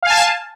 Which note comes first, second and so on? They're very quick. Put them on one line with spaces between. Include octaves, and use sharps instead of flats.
F5 G#5 A5